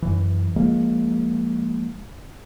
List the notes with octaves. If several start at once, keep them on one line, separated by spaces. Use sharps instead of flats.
F#2 E3
F3 G#3 A#3